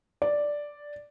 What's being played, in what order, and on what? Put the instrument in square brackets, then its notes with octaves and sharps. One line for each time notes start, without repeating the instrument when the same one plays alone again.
[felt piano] D5